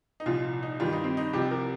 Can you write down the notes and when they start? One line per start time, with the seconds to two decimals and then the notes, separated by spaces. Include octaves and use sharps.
0.20 D#4
0.26 C2 A#2 F3 F4
0.63 D#4
0.80 G2 D#3 G3 F4
0.93 D#4
1.04 C4
1.17 D#4
1.33 C2 C3 F3 G4
1.51 A#4